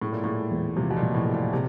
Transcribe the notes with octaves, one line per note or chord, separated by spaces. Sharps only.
A2 G#3
A#2
A2 G#3
E2
C3 F3
B2
A#2
F3
A2
G#3
A#2
C3 G#3